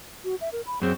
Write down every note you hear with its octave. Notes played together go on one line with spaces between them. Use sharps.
F#4
E5
A#4
B5
F#2 C4 G#4